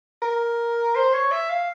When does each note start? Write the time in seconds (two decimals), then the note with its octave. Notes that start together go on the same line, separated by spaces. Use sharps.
0.22 A#4
0.95 C5
1.13 C#5
1.31 E5
1.50 F5